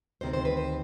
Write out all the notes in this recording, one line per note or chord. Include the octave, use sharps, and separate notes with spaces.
D2 C3 D#3 C5
C5
B4
C5